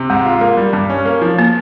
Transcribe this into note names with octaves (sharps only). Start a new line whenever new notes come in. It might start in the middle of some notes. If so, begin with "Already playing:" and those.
Already playing: C3
G#2 G#3
F4
A#3
G3
G2
C#4
A#3
F3
A#3